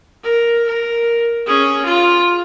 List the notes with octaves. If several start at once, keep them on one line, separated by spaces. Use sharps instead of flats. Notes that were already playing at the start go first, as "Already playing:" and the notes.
A#4
A#4
C#4 G#4
F4